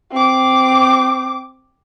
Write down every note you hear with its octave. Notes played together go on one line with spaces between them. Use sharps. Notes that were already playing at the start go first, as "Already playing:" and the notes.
C4 D6